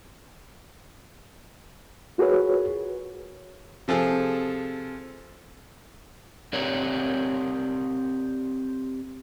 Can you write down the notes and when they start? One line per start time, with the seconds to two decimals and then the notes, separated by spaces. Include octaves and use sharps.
2.18 F4 F#4 G#4 A#4 B4 C#5
3.88 C3 F3 G#4 A4
6.53 C4 G4 A4 A#4 C#5 D5